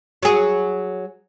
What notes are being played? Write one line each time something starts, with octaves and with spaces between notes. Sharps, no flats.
F#3 G#4